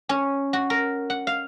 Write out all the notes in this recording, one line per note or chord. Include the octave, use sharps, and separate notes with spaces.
C#4
F#4
A#4
F#5
F5